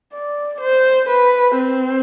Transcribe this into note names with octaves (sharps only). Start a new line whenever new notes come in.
D5
C5
B4
C4